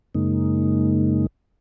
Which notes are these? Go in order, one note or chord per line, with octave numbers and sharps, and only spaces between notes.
F#2 C#3 G#3 A#3 D#4